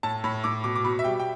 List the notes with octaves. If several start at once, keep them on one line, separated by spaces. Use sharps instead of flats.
A2 A5
A2 B5
A2 D6
B2 D6
D6
B2 B5
E5
G3 G5
G5